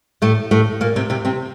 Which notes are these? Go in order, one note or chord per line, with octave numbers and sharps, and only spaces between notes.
A2 A3
A2 A3
A#2 A#3
C3 C4
C3 C4
C3 C4